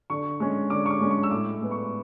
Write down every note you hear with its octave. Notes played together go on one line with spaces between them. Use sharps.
D3 C#6
G#3 C#4
D3 D6
C#6
D6
G#3 C#4
C#6
E6
A2 D6
G#3 B3
C#6